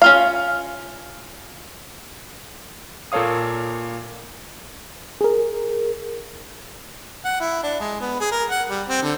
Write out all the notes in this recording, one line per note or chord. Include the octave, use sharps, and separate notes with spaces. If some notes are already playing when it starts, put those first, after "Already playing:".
C#4 F4 F5
A#2 A#3 A4 C#5 F5 D#6
G#4 A#4
F#5
E4
D4
G#3
B3
G#4
A#4
F#5
G3
C4
D3